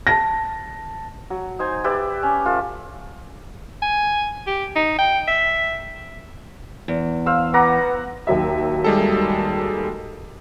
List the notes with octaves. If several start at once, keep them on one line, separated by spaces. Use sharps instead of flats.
A5 A#6
F#3
D#4 C5 G#5
G4 B4 D5 E5
C#4
A3 F4
G#5
G4
D#4
G5
E5
E2
C5 F5 E6
B3 F#5 A#5 D6
D#2 F#3 E5
G3 G#3 A4